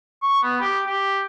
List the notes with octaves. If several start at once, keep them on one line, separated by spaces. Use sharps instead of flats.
C#6
B3
G4
G4